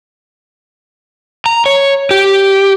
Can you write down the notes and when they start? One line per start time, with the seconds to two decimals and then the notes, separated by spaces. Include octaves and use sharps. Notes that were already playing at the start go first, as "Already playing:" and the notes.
1.46 A#5
1.66 C#5
2.11 G4